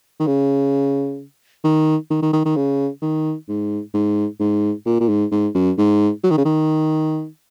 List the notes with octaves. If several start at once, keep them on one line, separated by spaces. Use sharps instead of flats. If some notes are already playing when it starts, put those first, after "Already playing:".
D#3
C#3
D#3
D#3
D#3
D#3
D#3
C#3
D#3
G#2
G#2
G#2
A#2
A#2
G#2
G#2
F#2
G#2
F#3
D#3
C#3
D#3